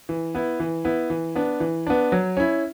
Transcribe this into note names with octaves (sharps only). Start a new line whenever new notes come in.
E3
B3 E4
E3
B3 E4
E3
B3 D4
E3
B3 D4
F#3
C#4 E4